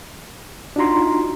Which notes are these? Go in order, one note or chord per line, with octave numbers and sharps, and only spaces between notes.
D4 D#4 F4 F#4 A#5 C6